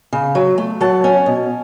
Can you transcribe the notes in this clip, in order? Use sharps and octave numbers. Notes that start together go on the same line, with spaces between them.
C#3
F#3
A3
F#3 F#5 A5
C#4
B2